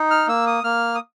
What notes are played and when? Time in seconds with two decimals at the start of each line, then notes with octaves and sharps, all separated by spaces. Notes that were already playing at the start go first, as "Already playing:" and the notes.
Already playing: D#4
0.11 F6
0.28 A#3 E6
0.47 D#6
0.64 A#3 F6
0.95 D#6